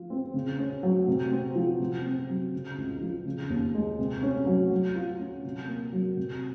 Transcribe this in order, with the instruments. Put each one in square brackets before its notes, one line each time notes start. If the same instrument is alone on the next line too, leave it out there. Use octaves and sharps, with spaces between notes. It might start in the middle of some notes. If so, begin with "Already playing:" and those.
Already playing: [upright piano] F3 F4
C4
C#3
C#4
F#3
C3
C4
F3
C3
C4
F#3
C#3
C#2
F3
C#3
D#2
G#3
C3
C#4
F#3
F#3
F4
C#4
C3
A#3
F#3
C3